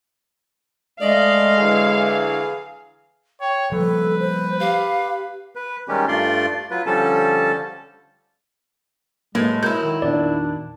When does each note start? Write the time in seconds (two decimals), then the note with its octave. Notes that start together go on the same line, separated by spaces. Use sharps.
1.01 G#3 A3 D5 D#5 F5
1.58 D3 E3 F#3 G#4
3.41 C#5 G5
3.72 F3 G3 A#3 A4 B4
4.19 C5
4.60 G4 F5
5.55 B4
5.88 D#3 G3 G#3 C#4 G4
6.08 G2 A3 F4 D5 C6
6.71 F#3 F4 B4
6.86 D3 F3 G3 C#4 A4 A5
9.35 A2 F#3 G#3 A#3 B4
9.63 F#3 E4 A#4 G6
9.82 D#3
10.02 E2 A#2 D#3 D4 D5